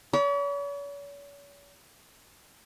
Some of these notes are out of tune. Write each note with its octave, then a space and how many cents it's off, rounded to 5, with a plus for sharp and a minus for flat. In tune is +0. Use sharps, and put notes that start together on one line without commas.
C#5 +45 B5 -30